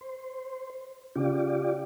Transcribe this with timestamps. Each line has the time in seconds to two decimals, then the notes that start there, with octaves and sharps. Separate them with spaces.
0.01 C5
1.15 C#3 F4 G4 D5